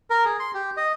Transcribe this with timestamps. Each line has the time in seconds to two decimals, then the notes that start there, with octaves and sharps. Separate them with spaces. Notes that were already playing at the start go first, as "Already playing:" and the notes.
0.10 A#4
0.25 G#4
0.40 C6
0.54 G4
0.77 D#5